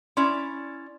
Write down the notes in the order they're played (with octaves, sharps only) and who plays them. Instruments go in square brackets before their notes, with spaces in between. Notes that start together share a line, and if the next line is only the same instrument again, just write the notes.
[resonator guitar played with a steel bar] C#4 E4 D5 [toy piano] C6